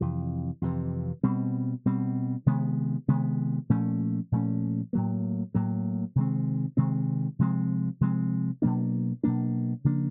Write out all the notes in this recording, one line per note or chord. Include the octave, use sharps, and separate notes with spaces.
F2 C3 E3
F2 C3 E3
B2 G3 C4
B2 G3 C4
C3 D#3 G#3 B3
C3 D#3 G#3 B3
A#2 F3 A3 C#4
A#2 F3 A3 C#4
A2 F#3 A#3
A2 F#3 A#3
C3 D#3 G#3 C4
C3 D#3 G#3 C4
C3 F3 G#3 C4
C3 F3 G#3 C4
B2 F#3 A#3 D4
B2 F#3 A#3 D4
C#3 F3 A#3 D4